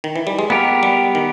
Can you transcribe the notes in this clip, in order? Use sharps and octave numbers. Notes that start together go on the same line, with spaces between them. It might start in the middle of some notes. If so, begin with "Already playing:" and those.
D#3
E3
G3
G#3
A#3 B3 G4 A#4
G3
D#3